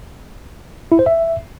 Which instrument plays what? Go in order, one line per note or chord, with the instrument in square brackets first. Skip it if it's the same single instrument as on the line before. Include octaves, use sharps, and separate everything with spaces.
[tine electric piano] E4
C5
E5